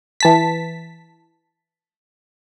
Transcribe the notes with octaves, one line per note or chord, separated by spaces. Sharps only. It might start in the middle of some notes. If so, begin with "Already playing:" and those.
E3 A5 B6